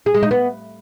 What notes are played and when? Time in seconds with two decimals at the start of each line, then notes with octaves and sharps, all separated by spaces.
0.06 G#4
0.14 G#3
0.23 D#4
0.31 B3